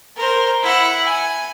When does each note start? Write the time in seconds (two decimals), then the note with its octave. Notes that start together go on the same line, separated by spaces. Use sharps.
0.17 A#4 C5
0.63 E4 F#5
1.06 G#5